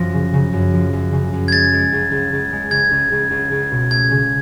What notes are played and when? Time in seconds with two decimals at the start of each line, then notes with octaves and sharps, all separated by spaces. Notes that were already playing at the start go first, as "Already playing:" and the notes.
Already playing: F#2 F3 A#6
0.14 C#3
0.34 C#3
0.53 F#2
0.74 F3
0.93 F#2
1.12 C#3
1.33 F#2
1.48 G#6
1.52 G#3 A6
1.72 G#3
1.93 C#2
2.12 C#2
2.33 C#2
2.52 G#3
2.71 C#2 G#6
2.91 C#2
3.12 C#2
3.31 C#2
3.52 C#2
3.71 B2
3.91 A3 G#6
4.11 C#3